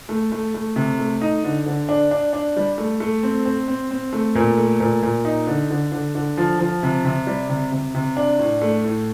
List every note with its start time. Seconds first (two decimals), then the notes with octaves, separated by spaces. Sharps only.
0.09 A3
0.32 A3
0.54 A3
0.76 C3
0.99 A3
1.21 D#4
1.44 D3
1.66 D3
1.89 D4
2.11 D4
2.33 D4
2.57 G3
2.78 A3
3.00 A3
3.23 C4
3.45 C4
3.68 C4
3.91 C4
4.13 A3
4.35 A#2
4.58 A3
4.80 A#2
5.03 A#2
5.25 D#4
5.47 D3
5.70 D3
5.92 D3
6.15 D3
6.37 F3
6.59 F3
6.83 C3
7.05 C3
7.27 G3
7.50 C3
7.72 C3
7.95 C3
8.17 D4
8.39 A2
8.62 A3
8.85 A2